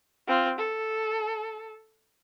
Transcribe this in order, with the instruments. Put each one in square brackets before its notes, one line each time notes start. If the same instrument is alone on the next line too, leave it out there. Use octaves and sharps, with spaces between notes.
[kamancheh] C4 F4
A4